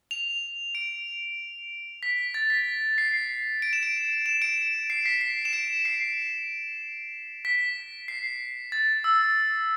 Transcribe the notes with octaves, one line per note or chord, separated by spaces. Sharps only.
F7
D7
B6
A6
B6
C7
D7
E7
D7
E7
D7
C7
B6
C7
E7
D7
C7
B6
C7
A6
E6